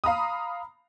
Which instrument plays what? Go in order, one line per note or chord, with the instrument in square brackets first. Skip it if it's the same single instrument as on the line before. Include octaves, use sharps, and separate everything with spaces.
[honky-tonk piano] F5 A#5 B5 D#6